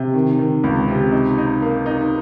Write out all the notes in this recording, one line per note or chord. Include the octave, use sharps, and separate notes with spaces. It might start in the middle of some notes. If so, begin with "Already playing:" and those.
Already playing: C3
D#3
D#3
C#2
C3
D#4
D#4
A#3
D#4